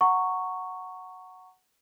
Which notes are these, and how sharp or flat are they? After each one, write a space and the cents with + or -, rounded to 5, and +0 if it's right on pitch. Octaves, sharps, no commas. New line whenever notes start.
F#5 +0 A#5 -20 C#6 +0